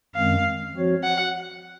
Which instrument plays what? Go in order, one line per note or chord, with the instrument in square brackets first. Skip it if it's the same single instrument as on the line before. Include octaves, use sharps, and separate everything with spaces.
[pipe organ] F#2 D#3 G#3 C4 [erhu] F5
[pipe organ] F3 C4 F#4 C#5
[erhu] F#5